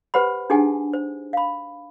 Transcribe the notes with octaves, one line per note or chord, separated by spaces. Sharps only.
G4 B4 C5 F#5 B5
D4 D#4 G4 G#4 F#5 G#5
C5
F5 B5